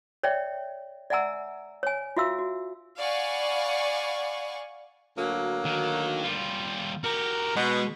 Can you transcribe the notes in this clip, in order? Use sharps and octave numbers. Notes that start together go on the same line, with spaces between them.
C#5 D5 E5 G5
D5 E5 F#5 G#5 A#5 E6
C#5 G#5
F4 F#4 E5 F5 E6
F#4
D5 F5 F#5 G#5 B5 C#6
D2 F#3 A#3
D#3
G3 F4
F#4 G4 A#4
B2 G#3